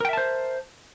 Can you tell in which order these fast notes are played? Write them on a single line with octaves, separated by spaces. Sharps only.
A#4 G5 E5 A5 C5